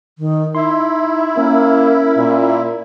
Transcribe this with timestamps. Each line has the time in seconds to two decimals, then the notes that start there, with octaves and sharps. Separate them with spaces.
0.19 D#3
0.55 D#4 E4 C6
1.38 A#3 C#4 A#4
2.17 A#2